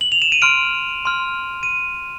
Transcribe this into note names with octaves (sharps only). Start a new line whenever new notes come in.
F#7
F7
E7
D#7
C6 F6 D7
C6 F6
D#7